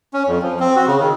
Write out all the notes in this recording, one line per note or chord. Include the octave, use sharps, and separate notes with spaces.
C#4
F2
F3
C4
F#4
C#3
D#3